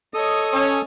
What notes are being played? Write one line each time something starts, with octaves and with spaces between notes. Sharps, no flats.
A4 C#5 D#5 D#6
C#4